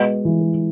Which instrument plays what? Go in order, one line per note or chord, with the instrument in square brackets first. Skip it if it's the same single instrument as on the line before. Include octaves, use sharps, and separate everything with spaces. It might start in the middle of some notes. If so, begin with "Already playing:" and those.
Already playing: [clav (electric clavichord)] B2 [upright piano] G#3
[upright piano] E3